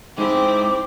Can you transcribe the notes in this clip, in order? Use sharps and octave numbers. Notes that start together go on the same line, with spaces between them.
G#2 G#3 C4 E4 D6